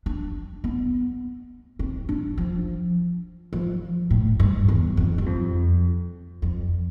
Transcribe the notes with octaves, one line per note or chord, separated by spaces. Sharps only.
D4
B3
C4
D4
F3
F3
A2
G2
E2
F2
G2
F2
F2